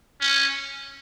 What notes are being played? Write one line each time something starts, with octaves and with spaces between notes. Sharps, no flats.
C#4